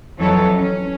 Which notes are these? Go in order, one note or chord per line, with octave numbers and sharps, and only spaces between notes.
F2 E3 F#3 A4 C#5
C#4